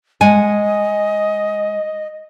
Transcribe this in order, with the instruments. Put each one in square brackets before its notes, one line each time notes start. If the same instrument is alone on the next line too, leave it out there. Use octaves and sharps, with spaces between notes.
[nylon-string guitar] G#3 F#5 G#5 [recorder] D#5